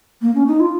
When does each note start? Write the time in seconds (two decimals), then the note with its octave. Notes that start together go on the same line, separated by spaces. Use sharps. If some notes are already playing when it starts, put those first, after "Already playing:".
0.22 A#3
0.35 C#4
0.48 D#4
0.60 F4